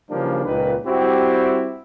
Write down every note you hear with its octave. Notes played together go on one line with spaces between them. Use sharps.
C#3 E3 F3 G3 A#3 D4
C#2 A#2 D#3 B4
G3 C4 E4 F#4 G4